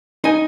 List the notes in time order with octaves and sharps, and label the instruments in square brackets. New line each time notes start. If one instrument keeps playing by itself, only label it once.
[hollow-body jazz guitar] D#4 D#5 G#5